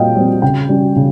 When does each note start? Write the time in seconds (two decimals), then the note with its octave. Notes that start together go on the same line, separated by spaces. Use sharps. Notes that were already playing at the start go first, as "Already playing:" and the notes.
Already playing: A#2 G3 C4 D#5 F5 G5
0.16 G3 C4
0.42 C#3 G5
0.69 G3 C#4
0.96 C#3